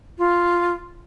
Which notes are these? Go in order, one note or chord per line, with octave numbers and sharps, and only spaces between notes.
F4